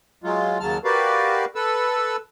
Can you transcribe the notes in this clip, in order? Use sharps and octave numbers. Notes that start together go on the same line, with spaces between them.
F#3 G#3 F4
D#2 C#3 F#3 A5 F6
F#4 G4 A#4 B4 D5 F5
A4 B4 E6